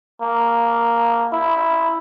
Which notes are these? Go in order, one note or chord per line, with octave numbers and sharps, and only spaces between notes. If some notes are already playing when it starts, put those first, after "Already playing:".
A#3
E4